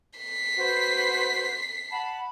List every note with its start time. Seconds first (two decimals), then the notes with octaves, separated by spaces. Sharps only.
0.19 B6 C7
0.57 F#4 B4 C5
1.91 F#5 A5 B5